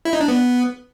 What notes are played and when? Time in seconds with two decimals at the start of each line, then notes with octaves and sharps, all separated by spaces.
0.05 E4
0.13 D#4
0.21 D4
0.28 B3